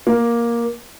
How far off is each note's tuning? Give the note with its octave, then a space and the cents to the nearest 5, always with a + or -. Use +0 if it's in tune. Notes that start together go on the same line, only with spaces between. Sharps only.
A#3 +10